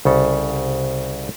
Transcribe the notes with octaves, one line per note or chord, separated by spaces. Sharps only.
C2 C#3 A4